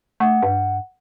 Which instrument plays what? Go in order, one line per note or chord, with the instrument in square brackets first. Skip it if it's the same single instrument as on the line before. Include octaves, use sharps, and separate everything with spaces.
[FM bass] A3 [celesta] F#5
[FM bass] G2